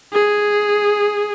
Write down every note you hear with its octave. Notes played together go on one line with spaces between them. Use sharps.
G#4